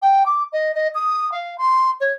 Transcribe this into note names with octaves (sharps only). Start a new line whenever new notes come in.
G5
D6
D#5
D#5
D#6
F5
C6
C#5